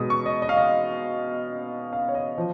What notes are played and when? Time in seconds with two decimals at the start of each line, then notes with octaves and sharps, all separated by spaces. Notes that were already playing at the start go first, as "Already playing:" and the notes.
Already playing: B2 G#3 B3 D#4 D#6
0.10 C#6
0.26 D#5
0.42 D#5
0.49 F5
0.57 D#5
1.93 F5
2.08 C#5
2.15 D#5
2.38 F3